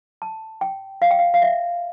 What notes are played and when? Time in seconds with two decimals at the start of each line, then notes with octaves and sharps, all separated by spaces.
0.22 A5
0.61 G5
1.02 F5
1.11 G5
1.19 F5
1.34 F5
1.42 E5